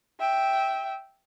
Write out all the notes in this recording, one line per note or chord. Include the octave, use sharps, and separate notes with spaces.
E5 G5